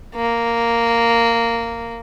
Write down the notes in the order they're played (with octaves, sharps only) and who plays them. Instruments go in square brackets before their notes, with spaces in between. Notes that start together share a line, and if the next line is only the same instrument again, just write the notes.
[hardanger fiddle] A#3